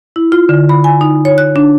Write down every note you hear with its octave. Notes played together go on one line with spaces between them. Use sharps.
E4
F4
D3
B5
G#5
D#4
C#5
F#6
D4